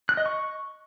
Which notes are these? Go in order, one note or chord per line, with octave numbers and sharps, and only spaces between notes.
F#6
D#5
C#6